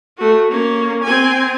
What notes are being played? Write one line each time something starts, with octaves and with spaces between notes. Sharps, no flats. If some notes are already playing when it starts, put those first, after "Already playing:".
A3 F#4
A#3 C#4
C4 G#5